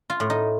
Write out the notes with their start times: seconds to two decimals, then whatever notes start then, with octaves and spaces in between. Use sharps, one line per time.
0.10 F4
0.20 A2
0.30 D#4